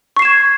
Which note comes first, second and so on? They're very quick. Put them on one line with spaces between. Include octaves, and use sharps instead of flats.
C#6 C7 E7 G#6